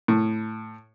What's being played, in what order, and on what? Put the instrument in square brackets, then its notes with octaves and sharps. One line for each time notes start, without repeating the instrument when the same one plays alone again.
[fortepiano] A2